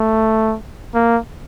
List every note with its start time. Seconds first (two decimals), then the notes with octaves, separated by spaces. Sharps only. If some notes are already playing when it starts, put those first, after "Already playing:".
Already playing: A3
0.94 A#3